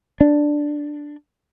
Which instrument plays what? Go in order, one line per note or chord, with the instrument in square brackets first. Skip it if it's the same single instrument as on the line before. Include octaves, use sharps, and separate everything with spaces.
[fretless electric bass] D4